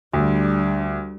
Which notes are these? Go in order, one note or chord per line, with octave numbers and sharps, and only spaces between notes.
D2 G3 D4